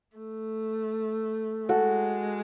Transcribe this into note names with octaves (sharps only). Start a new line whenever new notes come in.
A3
G#3 F#4 A4